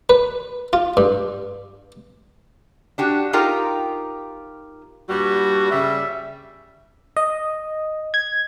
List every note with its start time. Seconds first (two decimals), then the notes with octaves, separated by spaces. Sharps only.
0.10 B4
0.73 F4
0.97 G2
2.98 D4 F#4 G4
3.33 D#4 F4 G4 A#4 G5
5.10 G2 A#2 G3 F#4
5.71 C#3 G3 E5
7.17 D#5
8.14 G#6